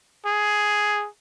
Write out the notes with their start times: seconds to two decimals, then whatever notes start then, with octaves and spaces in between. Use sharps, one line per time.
0.26 G#4